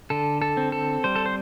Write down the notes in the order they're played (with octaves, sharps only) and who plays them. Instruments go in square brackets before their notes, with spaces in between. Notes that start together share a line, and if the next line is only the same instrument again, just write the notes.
[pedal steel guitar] D3 A4
A4
C4
A4
G3 C5
A4
C5